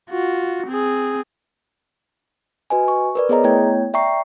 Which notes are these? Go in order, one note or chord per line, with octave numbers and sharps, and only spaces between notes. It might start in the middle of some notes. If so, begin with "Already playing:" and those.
F4 F#4
C4 G#4
F#4 B4 D#5 G#5
C#6
A#4 B4 D5
B3 G#4 C#5 D#5 A#5
A3 B3 E4 C#5 G5 G#6
D5 E5 G5 A#5 C#6 C7